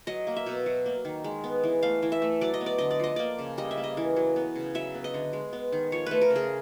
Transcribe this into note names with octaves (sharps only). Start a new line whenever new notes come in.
F#3 D#5
A#3
E5
B2
F#3
A#3
D#3
G#3
B3
E3
A3 F5
E3
E5
A3
F#3 D5
D#5
B3
D5
D3 D#5
D5
F3 D#5
A#3 D5
C#3
G3 D#5
E5
A#3
D#5
E3
F#3
B3
C#3
F#3 E5
B3
D#5
D3
G#3
B3
D#3
F3 C#5
A3 B4
A#4
C#3
G#4